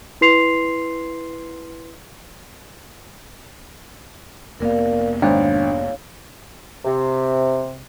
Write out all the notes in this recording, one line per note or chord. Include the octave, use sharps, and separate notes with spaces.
E4 B4 C6 C7 F7
F1 A#3 B3 A#4 D5 F5
G#1 D4 C#5 F5
C3